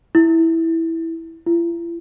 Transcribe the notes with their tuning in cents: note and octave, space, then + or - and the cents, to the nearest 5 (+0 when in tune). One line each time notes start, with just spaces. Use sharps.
E4 -5
E4 +45